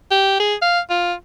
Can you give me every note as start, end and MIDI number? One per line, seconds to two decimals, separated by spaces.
0.11 0.35 67
0.40 0.55 68
0.62 0.80 77
0.90 1.13 65